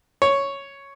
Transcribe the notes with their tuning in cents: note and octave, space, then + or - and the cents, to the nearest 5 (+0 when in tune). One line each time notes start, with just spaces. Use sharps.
C#5 +0